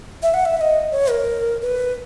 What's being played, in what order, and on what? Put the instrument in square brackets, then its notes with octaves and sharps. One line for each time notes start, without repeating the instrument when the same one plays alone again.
[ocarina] E5
F#5
E5
E5
D#5
C#5
A#4
B4